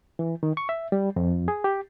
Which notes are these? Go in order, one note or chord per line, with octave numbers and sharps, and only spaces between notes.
E3
D#3
C#6
E5
G3
F2
G#4
G4